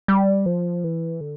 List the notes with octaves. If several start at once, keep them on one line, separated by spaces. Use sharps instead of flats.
G3
F3
E3
D3